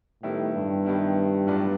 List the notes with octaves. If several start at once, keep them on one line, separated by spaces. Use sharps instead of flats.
A2 D#3 G3 B3 E4
G2
D#3 G3 B3 E4
A2 F#3 B3 D4 F4